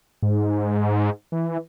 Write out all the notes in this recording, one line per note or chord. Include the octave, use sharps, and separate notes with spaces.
G#2
E3